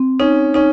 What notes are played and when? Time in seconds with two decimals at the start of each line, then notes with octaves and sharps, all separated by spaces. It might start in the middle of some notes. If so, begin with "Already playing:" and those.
Already playing: C4
0.20 C#4 D#4
0.54 C#4 D#4